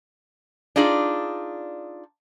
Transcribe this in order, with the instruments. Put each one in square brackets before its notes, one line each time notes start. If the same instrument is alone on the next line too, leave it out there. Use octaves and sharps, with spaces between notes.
[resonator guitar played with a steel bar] D4 D#4 F4 G#4 D5